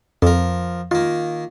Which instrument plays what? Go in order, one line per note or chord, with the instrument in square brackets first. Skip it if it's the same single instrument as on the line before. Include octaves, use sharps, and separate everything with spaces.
[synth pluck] F2 [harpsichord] F3 A#4
[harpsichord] D#3 A#3 [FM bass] F4